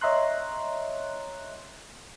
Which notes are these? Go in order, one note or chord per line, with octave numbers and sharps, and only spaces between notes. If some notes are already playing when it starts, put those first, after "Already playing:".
C#5 D#5 E5 A#5 C6 F#6